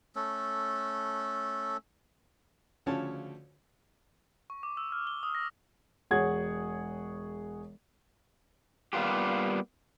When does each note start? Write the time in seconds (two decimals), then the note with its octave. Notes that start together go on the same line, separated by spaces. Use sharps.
0.15 A3 C#4 A4
2.86 D2 C#3 F3 C#4 C#5 A5
4.50 C#6
4.63 D6
4.77 E6
4.92 F6
5.07 G7
5.23 D#6
5.35 A#6
6.11 E1 G#4 C#5 F#5 G#6
8.93 G3 A#3 B3 F4 G4